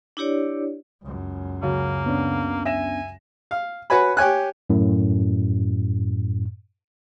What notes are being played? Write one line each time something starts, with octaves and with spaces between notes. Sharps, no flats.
D4 E4 G4 C#5 D5
C#2 F#2
C#3 F#3 A#3
B3 C#4 D4
E5 G#5 A#6 E7
F5
F#4 B4 C#5 G#5 B5
G4 C#5 G#5 F#6
F#2 A2